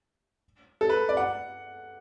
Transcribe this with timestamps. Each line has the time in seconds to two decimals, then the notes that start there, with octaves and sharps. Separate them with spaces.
0.81 A4
0.90 B4
1.09 D5
1.17 F#5